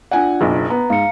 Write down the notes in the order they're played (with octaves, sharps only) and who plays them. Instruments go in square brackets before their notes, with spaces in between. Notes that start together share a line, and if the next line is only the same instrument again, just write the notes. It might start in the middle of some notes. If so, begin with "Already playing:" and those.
[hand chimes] D4 F4 D5 [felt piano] F#5 G#5
[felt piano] F#1 B1
[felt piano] B3 [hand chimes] A#5
[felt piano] G#2 [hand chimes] F5 C#7